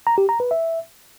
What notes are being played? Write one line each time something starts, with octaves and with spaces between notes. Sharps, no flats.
A#5
G4
A#5
B4
E5